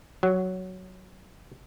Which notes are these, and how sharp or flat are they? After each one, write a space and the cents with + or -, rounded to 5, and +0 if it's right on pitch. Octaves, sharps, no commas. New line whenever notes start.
F#3 +5